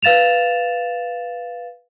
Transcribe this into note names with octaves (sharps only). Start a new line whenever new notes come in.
B4 F5 A6 E7 F7